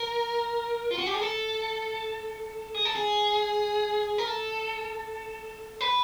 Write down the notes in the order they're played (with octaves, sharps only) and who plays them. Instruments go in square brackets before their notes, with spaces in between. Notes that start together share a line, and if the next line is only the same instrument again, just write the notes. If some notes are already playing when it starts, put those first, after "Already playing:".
Already playing: [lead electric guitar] A#4
F4
F#4
G4
G#4
A4
G#4
A4
G#4
A#4
A4
B4